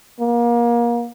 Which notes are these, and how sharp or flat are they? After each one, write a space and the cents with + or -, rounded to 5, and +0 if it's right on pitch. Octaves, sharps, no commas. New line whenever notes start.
A#3 +30